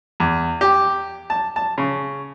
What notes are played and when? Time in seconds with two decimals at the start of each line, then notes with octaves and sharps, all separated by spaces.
0.20 E2
0.61 G4
1.30 A5
1.56 A5
1.78 C#3